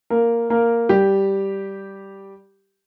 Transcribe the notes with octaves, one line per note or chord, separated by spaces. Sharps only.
A#3 A#4
A#3 A#4
G3 G4